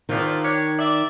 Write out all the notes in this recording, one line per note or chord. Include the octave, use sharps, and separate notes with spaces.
E2 A#2 D#3 F3
D4 G4 C#5
D5 E5